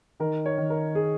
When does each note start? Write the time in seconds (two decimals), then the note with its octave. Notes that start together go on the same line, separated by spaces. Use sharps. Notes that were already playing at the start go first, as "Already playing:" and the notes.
0.20 D#3 A#4
0.46 C#5
0.58 D#3
0.70 A#4
0.95 G#4